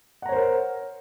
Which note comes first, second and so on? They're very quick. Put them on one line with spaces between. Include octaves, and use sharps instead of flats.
F#5 A#5 C#5 C5 A#4